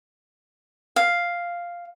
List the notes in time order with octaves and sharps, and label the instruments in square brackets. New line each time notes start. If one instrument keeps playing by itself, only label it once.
[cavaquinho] F5